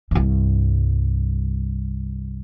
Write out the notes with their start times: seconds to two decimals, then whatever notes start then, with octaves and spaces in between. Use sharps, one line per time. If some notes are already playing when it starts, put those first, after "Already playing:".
0.11 C2 G2